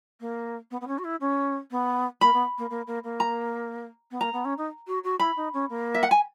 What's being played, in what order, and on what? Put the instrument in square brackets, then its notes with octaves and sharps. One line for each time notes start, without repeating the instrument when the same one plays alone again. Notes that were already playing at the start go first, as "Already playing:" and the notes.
[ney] A#3
B3
B3
C#4
F#4
E4
C#4
B3
[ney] A#3 [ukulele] B5
[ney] B3
A#3
A#3
A#3
A#3
[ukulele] A#5
[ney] B3
[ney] A#3 [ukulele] A#5
[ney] B3
C#4
D#4
F#4
F#4
[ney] E4 [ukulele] B5
[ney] D#4
C#4
A#3
[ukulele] E5
F#5
G#5